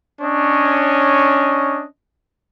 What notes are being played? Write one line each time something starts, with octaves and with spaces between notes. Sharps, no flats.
C#4 D4 C#5 D#5